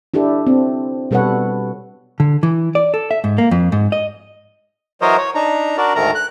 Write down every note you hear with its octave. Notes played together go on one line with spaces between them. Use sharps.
D4 E4 G4 A4
C4
B2 G3 A4 B4 C#5 F#5
D3
E3
D5
A4
E5
G#2
A#3
F2
G#2
D#5
E3 F#3 A#4 C5 C#5 D#5
C#5
D4 D#4 A#5
D4 F#4 A#4 D5
D2 G#2 D#3 A3 A#4 A#5
F#6